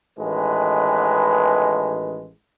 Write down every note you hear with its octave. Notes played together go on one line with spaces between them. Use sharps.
A1 D#3 G#3 B4